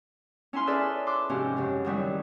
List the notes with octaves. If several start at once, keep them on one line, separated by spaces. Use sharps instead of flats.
C#4 E4 G#5 C6 F6
G#4 A4 B4 D5 E5 B5
C6 D6 E6 F#6
G#2 C3 F3 C#4 F#4 G4
F#2 C#3
D#3 F#3 G3 E4